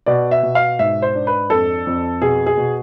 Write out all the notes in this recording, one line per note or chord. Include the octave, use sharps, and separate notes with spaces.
B2 D5
E5
B2
F5
G#2 E5
C5
D4
B4
F2 A4
F2
B2 G#4
G#4
B2